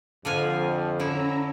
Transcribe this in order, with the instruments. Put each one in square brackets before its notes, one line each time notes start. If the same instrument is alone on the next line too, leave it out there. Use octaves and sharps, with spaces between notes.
[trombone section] F2 [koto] D3 F4 G#5
[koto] D3 E4 [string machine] C#4 A#5 E6